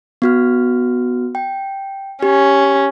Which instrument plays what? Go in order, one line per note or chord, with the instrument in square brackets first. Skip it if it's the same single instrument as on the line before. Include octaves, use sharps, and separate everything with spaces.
[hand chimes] B3 F#4 F6
G5
[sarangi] C#4 [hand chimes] G4